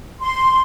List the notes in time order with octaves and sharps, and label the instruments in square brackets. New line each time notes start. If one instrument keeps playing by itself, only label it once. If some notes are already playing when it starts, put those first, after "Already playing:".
[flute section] C6